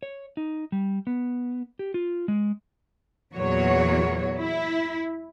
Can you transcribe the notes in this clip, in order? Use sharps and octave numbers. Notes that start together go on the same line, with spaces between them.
C#5
D#4
G3
B3
G4
F4
G#3
E2 A#2 F#3 F#4 C#5
E4